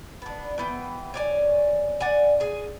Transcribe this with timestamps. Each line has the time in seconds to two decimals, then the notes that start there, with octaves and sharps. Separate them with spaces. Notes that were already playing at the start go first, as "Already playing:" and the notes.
0.22 B3 D4
0.58 E3 B3 G5
1.14 C#5 D5 G#5
2.00 D5 F#5 G#5
2.40 G#4 G#5